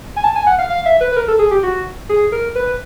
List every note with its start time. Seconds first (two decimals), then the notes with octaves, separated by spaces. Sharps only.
0.16 G#5
0.24 A5
0.35 G#5
0.47 F#5
0.58 F5
0.70 F5
0.86 E5
1.01 B4
1.12 B4
1.17 A#4
1.28 A4
1.39 G#4
1.51 G4
1.63 F#4
2.09 G#4
2.32 A#4
2.55 B4